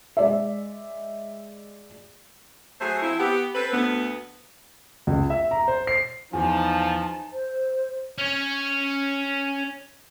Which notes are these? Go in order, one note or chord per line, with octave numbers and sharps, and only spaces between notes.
G#3 D5 E5
F#3 A3 G#4 C5
F3 C4 E4
B3 G4
C4 A4 B4
D2 B3
C#2
E5
A#5
C5
C7
E2 F3 D#4 G#5 A5
C5
C#4 C#5